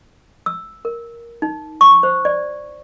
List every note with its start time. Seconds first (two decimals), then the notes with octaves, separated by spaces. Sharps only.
0.46 E6
0.85 A#4
1.42 D#4
1.81 C#6
2.03 C5
2.25 D5